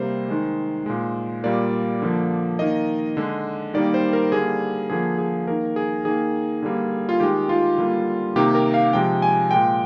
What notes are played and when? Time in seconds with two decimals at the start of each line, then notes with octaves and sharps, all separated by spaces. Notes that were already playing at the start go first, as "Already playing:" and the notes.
Already playing: C3 G3 A#3 C5
0.29 D#3 G#3
0.86 A#2 G#3
1.44 A#2 G3 A#3 D5
2.02 D3 F3 A#3
2.59 D#3 A#3 D#5
3.17 D3 G#3
3.74 D#3 G3 A#3 D5
3.94 C5
4.13 A#4
4.32 D3 G3 A#3 G#4
4.90 D3 F3 A#3 G#4
5.18 G#4
5.47 D#3 A#3 A#4
5.76 G#4
6.05 D#3 A#3 G#4
6.62 D3 G3 A#3
7.09 F4
7.20 D#3 G#3 G4
7.49 F4
7.78 D3 G3 A#3
8.36 C3 D#3 A#3 G4
8.55 A#4
8.74 F5
8.93 C3 F3 G#3 G5
9.22 G#5
9.51 A#2 G#3 G5